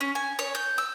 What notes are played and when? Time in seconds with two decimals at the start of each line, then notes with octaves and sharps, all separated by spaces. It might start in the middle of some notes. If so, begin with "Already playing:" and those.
0.01 C#4
0.15 G#5
0.39 C#5
0.55 G6
0.78 E6